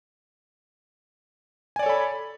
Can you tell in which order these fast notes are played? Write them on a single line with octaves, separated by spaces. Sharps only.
G#5 D5 C#5 A4 B5